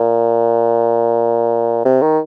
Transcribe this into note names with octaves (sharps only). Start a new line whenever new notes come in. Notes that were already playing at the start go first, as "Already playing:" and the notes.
Already playing: A#2
C3
D#3